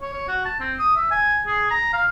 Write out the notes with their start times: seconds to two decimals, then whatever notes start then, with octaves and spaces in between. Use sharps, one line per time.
0.01 C#5
0.13 C#5
0.28 F#4
0.45 A5
0.60 C4
0.79 D#6
0.96 E5
1.11 G#5
1.47 G#4
1.71 A#5
1.93 F5